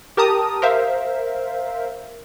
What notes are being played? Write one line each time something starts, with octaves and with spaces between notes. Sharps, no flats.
G4 A#4 A5 A#5 D#6
A#4 C5 E5 F5